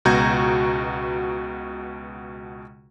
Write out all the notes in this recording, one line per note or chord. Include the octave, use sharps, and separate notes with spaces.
C#2 B2 F#4 A#5 G6 G#6